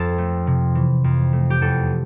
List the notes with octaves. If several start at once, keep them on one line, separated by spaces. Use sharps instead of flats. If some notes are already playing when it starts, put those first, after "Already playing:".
Already playing: F2 A4
A3
C3
E3
F2
A3
G4
E2 A4